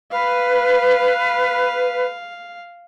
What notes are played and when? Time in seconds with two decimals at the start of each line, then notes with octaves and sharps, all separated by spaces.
0.11 B4 F5